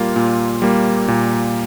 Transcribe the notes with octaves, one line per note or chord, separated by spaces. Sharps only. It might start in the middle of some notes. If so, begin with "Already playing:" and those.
Already playing: A#2 G3 A#3 F4
A#2
G3 A#3
A#2